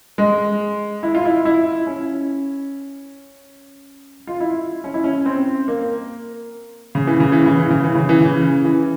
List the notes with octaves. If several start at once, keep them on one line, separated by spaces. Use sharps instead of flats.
G#3
E4
F4
E4
E4
C#4
F4
E4
C#4
E4
C#4
C4
A#3
C#3
E3
C#3
E3
C#3
E3
C#3
E3
C#3
E3
C#3
E3